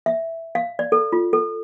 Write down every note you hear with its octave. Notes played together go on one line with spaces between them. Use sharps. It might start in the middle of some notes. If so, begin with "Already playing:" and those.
E5
F5
D5
A4
F4
A4